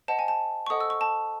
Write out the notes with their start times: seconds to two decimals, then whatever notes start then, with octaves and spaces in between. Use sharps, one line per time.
0.08 C5 D#5 F#5 A5
0.19 G#5
0.28 A5
0.67 C#6
0.70 A4 C5 D#5 F#5 D#6
0.81 E6
0.90 C#6
1.01 A5